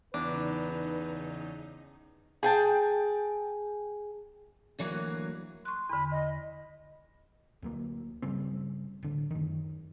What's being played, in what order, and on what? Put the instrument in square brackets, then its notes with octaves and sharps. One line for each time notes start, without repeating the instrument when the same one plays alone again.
[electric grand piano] E2 [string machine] C#3 D#4 [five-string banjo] D4 [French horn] B4
[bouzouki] G#4 G5 A5
[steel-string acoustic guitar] D2 E3 F#3 A#3
[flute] C6 [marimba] C#6 F#6
[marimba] E2 D3 [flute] B5
[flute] D#5
[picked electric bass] D2 F#3 A#3
G2 C#3 G3 C4
D1 D3
F#2 D#3